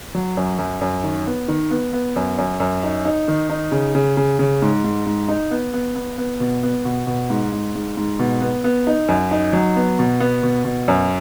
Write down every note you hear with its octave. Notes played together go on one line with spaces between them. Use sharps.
F#3
F#2
F#2
F#2
D#3
B3
D#3
B3
B3
F#2
F#2
F#2
D#4
D#4
D#3
D#4
C#3
C#3
C#3
C#3
G#2
G#2
G#2
D#4
B3
B3
B3
B3
B2
B3
B2
B2
G#2
G#2
G#2
G#2
B2
B3
B3
D#4
F#2
D#4
F#3
B3
B2
B3
B2
B2
F#2